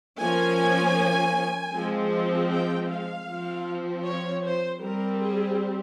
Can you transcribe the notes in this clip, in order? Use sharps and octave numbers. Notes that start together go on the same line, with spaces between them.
F3 A#3 C#4 G#5
F3 G#3 C4
G5
F5
F3 C4
C#5
C5
G3 C4 A#4
G#4